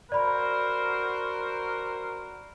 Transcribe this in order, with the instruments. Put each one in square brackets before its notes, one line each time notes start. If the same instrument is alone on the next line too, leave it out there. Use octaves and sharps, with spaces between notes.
[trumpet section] F#4 A#4 C5 [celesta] D5 B5